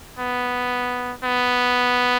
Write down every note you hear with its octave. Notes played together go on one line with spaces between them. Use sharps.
B3
B3